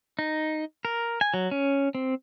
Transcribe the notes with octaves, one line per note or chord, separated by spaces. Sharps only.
D#4
A#4
G#5
F#3
C#4
C4